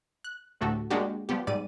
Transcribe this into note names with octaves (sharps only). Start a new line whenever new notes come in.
F#6
D2 A2 A3 F#4 G4 A4
G#3 A#3 D4 F#4 G4
F3 G3 B3 G4
G#2 G3 D5 D#7